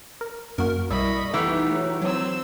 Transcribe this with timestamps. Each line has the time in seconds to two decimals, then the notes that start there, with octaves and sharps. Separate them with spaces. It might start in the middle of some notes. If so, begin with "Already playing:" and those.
0.21 A#4
0.58 F#2 A#3 F#4 A#4
0.90 B1 G3 E4 D#5 E5 B5 C#6
1.34 E3 A3 B3 D#4 G4
1.72 F#3
2.01 F#3 C4 E6